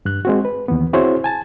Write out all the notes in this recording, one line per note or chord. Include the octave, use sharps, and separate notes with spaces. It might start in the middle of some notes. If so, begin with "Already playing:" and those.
G2 F#6
G#3 C4 F#4
B4
D#2 E3 B3
C4 E4 F#4 G#4 C5 C#5
G#5 A5